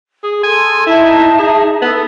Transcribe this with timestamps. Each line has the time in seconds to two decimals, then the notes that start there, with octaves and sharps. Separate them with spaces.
0.23 G#4
0.43 A4 G#5 C6
0.86 D#4 E4 E5 A5
1.39 G#4
1.81 B3 A4